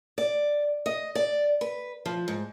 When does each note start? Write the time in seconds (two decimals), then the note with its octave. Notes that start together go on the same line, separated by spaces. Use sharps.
0.18 D5
0.86 D#5
1.15 D5
1.61 B4
2.06 F3
2.28 G#2